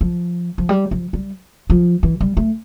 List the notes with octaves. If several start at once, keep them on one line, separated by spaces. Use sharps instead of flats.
F3
F3
G3
F3
G3
F3
E3
G3
A3